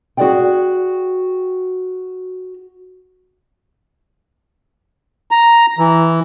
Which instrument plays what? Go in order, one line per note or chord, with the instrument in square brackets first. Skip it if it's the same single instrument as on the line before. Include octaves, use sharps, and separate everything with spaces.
[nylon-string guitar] F#4 G#4 C5 D5 F#5 G5
[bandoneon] A#5
E3